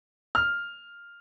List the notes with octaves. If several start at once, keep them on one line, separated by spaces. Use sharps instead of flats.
F6